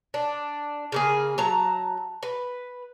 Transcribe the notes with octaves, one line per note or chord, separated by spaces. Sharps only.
D4
C#3 A#3 G#4
F#3 A5 A#5
B4